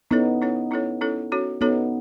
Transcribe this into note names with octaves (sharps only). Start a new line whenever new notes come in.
B3 C#4 D#4 E4 A4 C#5
C#4 E4 A4 C#5
C#4 E4 A4 C#5
C#4 E4 A4 C#5
C#4 F#4 A4 C#5
B3 C#4 D#4 F#4 A4 C#5